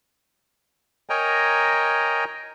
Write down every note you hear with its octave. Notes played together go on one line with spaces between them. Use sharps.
A#4 C#5 D#5 G5 G#5 A#5